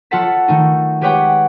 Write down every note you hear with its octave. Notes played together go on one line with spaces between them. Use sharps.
F#3 F4 A4 F#5 A5 B6
D#3 A3 D#4
G#3 G4 B4 C#5 F#5 G5